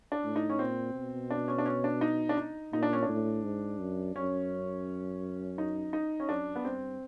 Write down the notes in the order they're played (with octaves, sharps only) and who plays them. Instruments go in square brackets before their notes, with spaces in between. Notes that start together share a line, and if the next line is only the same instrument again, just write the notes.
[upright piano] D4
[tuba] A2
[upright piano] D#4
C#4
[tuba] A#2 [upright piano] C4
[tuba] B2
[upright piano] D4
C#4
D4
C#4
D4
D#4
D4
D#4
[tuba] A#2 [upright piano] D#4
[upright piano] D4
C#4
D4
[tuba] A2
G#2
F#2
[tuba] F#2 [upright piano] C#4
[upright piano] D#4
D#4
C#4
[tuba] F#2 [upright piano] D4
[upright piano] B3
[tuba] G2 [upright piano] C4